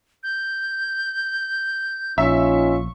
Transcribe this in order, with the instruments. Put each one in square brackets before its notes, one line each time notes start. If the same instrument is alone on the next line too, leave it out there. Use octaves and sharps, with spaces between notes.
[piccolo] G6
[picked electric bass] A#1 [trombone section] C#4 D#4 F4 [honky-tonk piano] E5 [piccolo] C#6